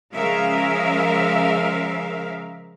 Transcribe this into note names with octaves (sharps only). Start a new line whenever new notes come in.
C#3 F3 G#3 A#4 E5 F5